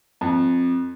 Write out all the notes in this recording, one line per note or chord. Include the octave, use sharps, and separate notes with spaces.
F2